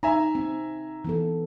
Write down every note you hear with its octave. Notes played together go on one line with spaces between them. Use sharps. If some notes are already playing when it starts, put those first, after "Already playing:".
D#4 E5 G#5 A#5
C4
E3 B3 A4